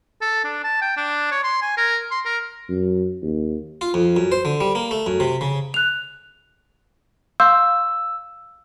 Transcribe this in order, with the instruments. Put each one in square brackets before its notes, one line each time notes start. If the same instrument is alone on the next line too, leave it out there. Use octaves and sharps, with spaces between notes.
[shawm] A4
D4
A5
G5
D4
C#5
C6
G#5
A#4
C6
A#4
[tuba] F#2
D#2
[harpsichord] F4
F2
F#2
C5
D3
G3
A#3
A3
F#2
C3
C#3
[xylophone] F#6 F7
[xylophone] F5 C6 G6 [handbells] E6